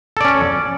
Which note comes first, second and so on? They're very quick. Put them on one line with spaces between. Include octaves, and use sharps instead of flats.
A4 D5 C#4